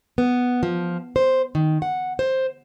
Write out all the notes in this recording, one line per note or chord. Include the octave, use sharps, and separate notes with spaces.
B3
F3
C5
D#3
F#5
C5